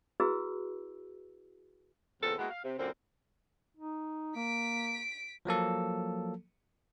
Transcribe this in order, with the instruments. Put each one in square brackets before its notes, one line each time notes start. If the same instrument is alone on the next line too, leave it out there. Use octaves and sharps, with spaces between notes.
[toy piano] E4 F#4 G#4 B4 E6
[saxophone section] E2 A#2 C#3 C4 A4
G#3 A#3 B3 E4 F#4
F5
C3
F#2 A#2 D3 C4
[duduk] D#4
[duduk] A#3 [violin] B6 D7
[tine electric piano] F3 F#3 A#3 A4